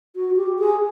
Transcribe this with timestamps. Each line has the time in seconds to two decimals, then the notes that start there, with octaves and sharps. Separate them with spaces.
0.15 F#4
0.36 G4
0.59 G#4